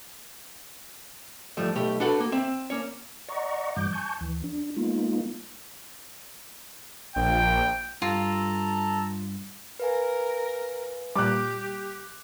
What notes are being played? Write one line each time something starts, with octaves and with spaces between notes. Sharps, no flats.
D2 G#2 F3 G3 A3
B1 A3 G4
D4 F#4 A4 B4 F#5
A#3
C4 E5
A#3 C#4 C#5
D5 D#5 F#5 A#5 C#6
G2 E3 G3 D6 G6
G#5 A5 C#6 G6
D2 E3
D4
G#3 A#3 B3 D#4 F4
A#1 G5
G2 F4 A4 A5 A#5
A#4 B4 F5 G#5
A#2 G3 G4 D6 F#6